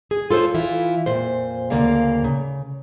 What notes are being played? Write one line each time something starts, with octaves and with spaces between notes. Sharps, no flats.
G#4
F4 A4 A#4 C5 C#5
E3 E4 F4
F2 A#2 C5
D2 C#3 A#3 D5 F5
C#3